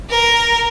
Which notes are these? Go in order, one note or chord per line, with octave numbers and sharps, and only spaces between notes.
A#4